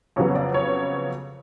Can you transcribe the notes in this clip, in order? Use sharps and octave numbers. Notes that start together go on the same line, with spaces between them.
F2 C#3 F#3 B3 C#5
D5
C#5